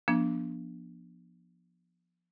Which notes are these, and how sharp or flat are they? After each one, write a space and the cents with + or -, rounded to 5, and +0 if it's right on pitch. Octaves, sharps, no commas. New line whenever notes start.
F3 +0 B3 -40 D4 +0